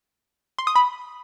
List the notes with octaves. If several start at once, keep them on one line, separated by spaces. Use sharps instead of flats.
C6
D#6
B5